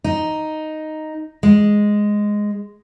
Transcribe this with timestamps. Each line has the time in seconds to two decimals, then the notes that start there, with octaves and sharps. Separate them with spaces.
0.04 D#4
1.43 G#3